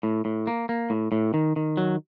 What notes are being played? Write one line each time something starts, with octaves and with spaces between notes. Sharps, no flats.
A2
A2
A#3
A#3
A2
A2
D#3
D#3
F#3